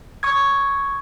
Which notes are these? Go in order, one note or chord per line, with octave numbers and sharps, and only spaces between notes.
C#6 D#6 G#6